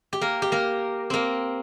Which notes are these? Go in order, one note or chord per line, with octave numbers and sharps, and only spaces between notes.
G4
A#3 A#4
G4
A#3 A#4
A#3 C4